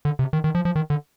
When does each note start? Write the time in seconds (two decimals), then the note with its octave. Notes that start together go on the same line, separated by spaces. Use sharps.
0.05 D3
0.19 C3
0.33 D#3
0.44 D#3
0.55 F3
0.65 F3
0.76 D#3
0.90 D3